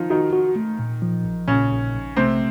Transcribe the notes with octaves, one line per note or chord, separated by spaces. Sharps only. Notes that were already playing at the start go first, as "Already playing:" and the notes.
Already playing: D#3 F3 D#4 F4
D#3 D#4 F#4
F#4
A3
A#2
F3
A#1
A#2 C#3 C#4
A#1
A#1
C3 A3 C4